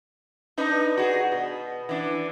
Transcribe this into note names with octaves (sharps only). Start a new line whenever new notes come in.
D4 D#4 B4
F#4 G#4
B2
E3 D4